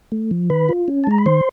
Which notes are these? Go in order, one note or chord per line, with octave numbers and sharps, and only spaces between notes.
A3
F3
D#3 B4 B5
F4
C#4
A5
G#3 A#5
B5
D#3 C5 C6